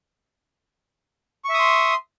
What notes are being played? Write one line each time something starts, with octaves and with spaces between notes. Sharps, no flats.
E5 C6 C#6 D#6